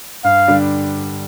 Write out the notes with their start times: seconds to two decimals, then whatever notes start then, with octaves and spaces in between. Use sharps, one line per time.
0.24 G2 F5
0.48 D3 G3 D4